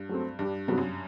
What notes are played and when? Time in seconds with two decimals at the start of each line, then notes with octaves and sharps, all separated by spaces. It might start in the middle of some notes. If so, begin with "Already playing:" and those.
Already playing: G2
0.09 F#3 A3 C4
0.39 G2 G3 D4 G4
0.68 G2 C3 F#3 B3 F#4
0.78 F#2